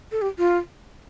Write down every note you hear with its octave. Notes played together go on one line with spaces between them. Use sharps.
A4
G4
F4